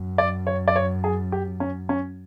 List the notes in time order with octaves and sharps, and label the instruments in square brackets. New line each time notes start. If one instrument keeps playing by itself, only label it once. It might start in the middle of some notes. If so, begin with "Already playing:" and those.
Already playing: [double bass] F#2
[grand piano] D5
C#5
D5
C#5
G#4
G4
C#4
C#4